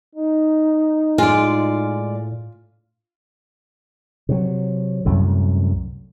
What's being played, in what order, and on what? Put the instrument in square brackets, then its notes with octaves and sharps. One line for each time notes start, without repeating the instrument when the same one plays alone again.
[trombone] D#4
[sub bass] A2 [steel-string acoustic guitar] G#3 D5 [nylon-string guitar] F4
[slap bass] C3 F#3
C2 F#2 A2